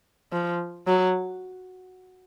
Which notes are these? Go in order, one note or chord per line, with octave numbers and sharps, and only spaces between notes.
F3
F#3